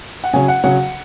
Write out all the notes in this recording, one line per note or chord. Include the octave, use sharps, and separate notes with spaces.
F#5
C#3 F#3 C#4 G#5
F#5
C#3 F#3 C#4 F#5